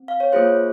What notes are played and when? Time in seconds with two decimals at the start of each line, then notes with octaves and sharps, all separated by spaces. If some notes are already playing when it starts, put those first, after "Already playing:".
Already playing: C4
0.08 F5
0.20 C#5
0.33 A#3 F4 G#4 C5